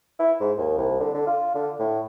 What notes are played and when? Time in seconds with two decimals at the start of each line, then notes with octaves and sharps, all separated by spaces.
0.19 E4
0.40 G#2
0.58 D#2
0.78 C2
1.00 D3
1.14 D3
1.27 F4
1.55 D3
1.79 A2